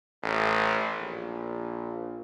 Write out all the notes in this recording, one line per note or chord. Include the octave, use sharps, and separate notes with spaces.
A1
A#1